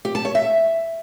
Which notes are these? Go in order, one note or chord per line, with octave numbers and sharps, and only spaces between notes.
G4
A5
C#5
E5